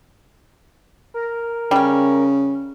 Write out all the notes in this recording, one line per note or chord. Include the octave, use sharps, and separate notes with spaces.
A#4
C#3 G3 C#4